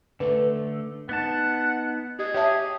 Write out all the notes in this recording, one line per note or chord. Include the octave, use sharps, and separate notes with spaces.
D3 A3 B4
B3 D#4 F#5 A5
G4 G#4 D#5
G4 C#5 E5 A5